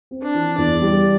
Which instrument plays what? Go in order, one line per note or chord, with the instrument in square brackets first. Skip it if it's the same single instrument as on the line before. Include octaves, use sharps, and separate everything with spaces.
[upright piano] C4
[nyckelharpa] D4
[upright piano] E3
[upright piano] E2 [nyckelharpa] D5
[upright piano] G3